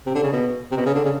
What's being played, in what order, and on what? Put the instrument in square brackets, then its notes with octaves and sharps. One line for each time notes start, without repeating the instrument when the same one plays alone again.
[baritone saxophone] C3
D3
C#3
B2
C3
B2
C#3
D3
C#3